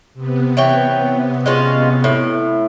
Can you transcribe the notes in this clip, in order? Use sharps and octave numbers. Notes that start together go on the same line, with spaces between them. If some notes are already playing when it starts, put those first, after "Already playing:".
C3 B3
E3 C#5 G5
G#3 C#4 F4
A2